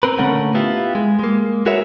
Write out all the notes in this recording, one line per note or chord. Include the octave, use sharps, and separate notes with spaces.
C4 A#4 B4
A#2 D3 A3 C#4 A#4 F#5
B3 E4 F4 G4
G#3
G#3 A#3
F#4 G#4 A#4 B4 C#5 E5